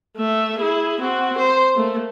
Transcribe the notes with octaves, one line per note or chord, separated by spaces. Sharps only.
A3 E5
E4 G#4
C4 F#4
C5
A3 A#3